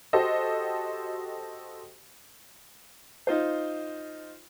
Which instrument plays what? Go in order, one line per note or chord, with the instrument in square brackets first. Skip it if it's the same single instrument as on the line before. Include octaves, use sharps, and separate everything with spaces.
[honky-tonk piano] F#4 G4 A4 C5 D#5
[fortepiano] D#4 F4 C5